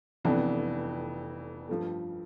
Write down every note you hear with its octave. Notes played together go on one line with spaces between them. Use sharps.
F1 F2 E3 B3 D4
G2 F3 A3